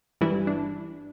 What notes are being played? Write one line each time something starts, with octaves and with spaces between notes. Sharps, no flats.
G1 G2 E3 G3 E4
D4